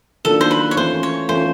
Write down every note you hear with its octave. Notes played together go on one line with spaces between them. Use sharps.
D#3 F#3 A#3 D4 F4 A4
C5
B4
C#5
E3 A3 C#4 F4 C5
C#5
E3 A3 C#4 F4 C5